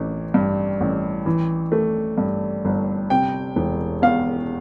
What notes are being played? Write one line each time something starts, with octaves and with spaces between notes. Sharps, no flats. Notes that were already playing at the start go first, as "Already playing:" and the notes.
Already playing: A1 E3
G2
A1
E3
A3
G2
G1
C3 G5
E1
E2 F5